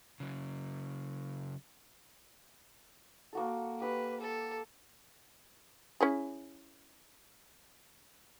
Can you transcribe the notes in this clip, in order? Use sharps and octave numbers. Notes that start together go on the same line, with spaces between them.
C#3 F#3
A#3 F#4 A4
G4 B4 E6
A4
C#4 E4 G#4